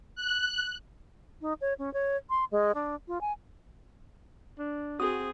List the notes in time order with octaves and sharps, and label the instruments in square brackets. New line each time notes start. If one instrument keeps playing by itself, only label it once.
[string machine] F#6
[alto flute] D#4
C#5
C#4
C#5
C6
G#3
D4
F4
G#5
[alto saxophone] D4
[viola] C4 G#4 [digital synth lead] F#4 [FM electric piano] D#6